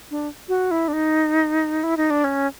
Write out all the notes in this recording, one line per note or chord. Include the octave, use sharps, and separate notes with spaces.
D4
F#4
E4
D4
D#4
E4
D#4
D4
C#4